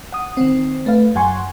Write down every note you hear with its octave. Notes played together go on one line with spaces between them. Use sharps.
F#5 D#6
D#3 C4
A3 B4 F5
F#2 F#3 F#5 G#5 C6 C#6